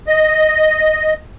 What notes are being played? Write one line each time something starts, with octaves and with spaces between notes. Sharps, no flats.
D#5